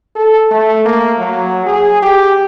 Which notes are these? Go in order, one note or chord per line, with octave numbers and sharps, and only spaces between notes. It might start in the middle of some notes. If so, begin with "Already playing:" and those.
A4
A3
A#3
F#3
G#4
G4